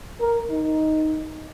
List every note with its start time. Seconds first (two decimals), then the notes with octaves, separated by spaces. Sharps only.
0.20 A#4
0.50 D#4